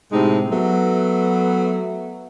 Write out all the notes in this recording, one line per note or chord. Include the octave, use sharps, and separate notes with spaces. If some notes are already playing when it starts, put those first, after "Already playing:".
A2 C3 G#3 D#4
F#3 A3 B3